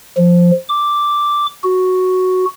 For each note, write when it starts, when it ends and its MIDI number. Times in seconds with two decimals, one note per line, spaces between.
0.17 0.51 53
0.69 1.46 86
1.64 2.45 66